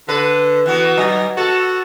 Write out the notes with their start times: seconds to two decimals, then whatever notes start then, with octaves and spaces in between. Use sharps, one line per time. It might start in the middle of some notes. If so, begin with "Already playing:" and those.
0.09 D3 B4
0.66 E3 B3 F#4
0.98 F#3 D#4
1.37 F#4 A4